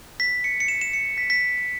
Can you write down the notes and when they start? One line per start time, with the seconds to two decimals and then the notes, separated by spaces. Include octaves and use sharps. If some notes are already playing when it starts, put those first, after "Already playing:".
0.20 B6
0.44 C#7
0.60 C#7
0.68 E7
0.81 E7
0.93 C#7
1.18 B6
1.30 B6